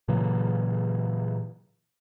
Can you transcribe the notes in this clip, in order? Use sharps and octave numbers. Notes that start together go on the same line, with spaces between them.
A#2 C#3 E3 F#3